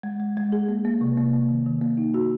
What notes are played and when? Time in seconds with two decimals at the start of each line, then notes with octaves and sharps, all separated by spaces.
0.03 G#3
0.20 G#3
0.37 G#3
0.52 G#4
0.69 A#3
0.85 A#3
1.01 C3
1.18 A#3
1.33 A#3
1.49 D#3
1.66 D#3
1.81 A#3
1.98 D#4
2.14 F#4